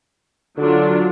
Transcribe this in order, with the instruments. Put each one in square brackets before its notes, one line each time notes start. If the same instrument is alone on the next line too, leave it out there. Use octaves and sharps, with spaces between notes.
[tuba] D3 [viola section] F#3 D4 F4